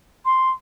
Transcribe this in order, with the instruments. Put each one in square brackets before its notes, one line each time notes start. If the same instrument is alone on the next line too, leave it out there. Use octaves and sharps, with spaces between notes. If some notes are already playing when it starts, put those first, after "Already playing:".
[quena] C6